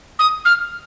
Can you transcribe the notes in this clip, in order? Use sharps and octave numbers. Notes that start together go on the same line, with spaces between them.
D#6
F6